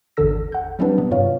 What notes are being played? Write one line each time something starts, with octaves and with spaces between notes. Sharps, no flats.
G#1 E2 D3 A4 E6 A#6
F#5 G6
F#3 G3 C4 D4 B4
C3 B3
G2 F4 C#5 F5